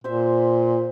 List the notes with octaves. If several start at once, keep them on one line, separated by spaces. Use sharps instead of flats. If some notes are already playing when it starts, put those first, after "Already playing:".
A#2 C5 E5